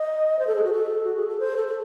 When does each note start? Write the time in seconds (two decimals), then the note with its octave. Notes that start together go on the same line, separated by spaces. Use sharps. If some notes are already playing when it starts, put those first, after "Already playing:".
Already playing: D#5
0.39 C5
0.47 A4
0.55 G#4
0.64 F#4
0.72 A4
1.04 F#4
1.16 G#4
1.28 A4
1.40 C5
1.57 A4
1.68 A4